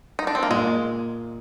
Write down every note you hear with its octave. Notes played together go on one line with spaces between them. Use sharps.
D#4
D4
C4
A#3
A#2 G#3